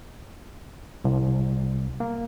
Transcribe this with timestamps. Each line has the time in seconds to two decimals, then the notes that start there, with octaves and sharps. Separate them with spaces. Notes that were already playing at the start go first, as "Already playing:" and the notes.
1.04 C2
2.00 A#3